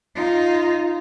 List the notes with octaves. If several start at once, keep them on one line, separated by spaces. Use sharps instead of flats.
D#4 F4